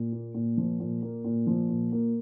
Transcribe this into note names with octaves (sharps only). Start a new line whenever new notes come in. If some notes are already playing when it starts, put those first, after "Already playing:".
Already playing: A#2
A#3
A#2
F3
A#2
A#3
A#2
F3
A#2
A#3